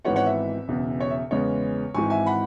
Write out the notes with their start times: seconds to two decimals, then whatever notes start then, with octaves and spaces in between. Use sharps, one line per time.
0.05 G#1 G#2 E3 B3 C#5 F#5
0.16 C#5 F#5
0.26 E5
0.68 E1 E2 C#3
1.00 C#5
1.10 E5
1.31 E2 C#3 G#3 B3 C#5
1.94 G#1 G#2 E3 G#5 C#6
2.10 E5 G#5
2.26 F#5 B5